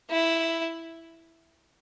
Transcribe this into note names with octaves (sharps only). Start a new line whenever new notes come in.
E4